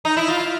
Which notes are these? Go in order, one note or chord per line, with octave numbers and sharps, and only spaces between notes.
D#4
E4
F4